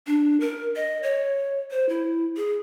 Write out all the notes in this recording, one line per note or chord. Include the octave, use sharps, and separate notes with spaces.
D4
A#4
D#5
C#5
C5
E4
G#4